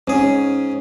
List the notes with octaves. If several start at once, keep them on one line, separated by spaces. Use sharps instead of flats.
G#2 C#4 G#4